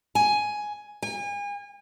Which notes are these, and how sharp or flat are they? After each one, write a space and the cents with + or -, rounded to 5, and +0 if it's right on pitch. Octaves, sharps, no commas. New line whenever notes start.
G#5 +10
G#5 -35